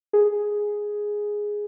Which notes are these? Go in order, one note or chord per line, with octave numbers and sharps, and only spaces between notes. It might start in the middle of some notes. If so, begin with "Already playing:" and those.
G#4